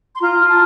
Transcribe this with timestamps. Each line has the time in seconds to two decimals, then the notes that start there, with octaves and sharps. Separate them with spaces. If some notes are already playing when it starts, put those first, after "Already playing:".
0.16 C6
0.20 F4 A#5
0.40 F4
0.49 A5